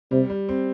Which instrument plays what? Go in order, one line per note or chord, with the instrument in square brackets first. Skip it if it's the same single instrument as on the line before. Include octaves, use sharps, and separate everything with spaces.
[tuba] C3 [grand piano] G3
[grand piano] G3
C4